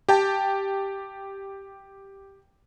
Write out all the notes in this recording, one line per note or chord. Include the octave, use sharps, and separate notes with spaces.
G4 G5 A5